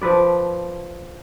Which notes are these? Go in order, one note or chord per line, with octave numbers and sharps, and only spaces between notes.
F3 A4 B4 D5